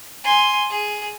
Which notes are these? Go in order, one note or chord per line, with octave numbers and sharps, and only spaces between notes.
G#5 C6
G#4